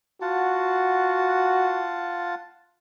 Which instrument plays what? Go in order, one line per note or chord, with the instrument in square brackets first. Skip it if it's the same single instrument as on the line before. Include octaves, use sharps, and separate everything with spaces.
[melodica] F4 F#5 A5 [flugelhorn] F#4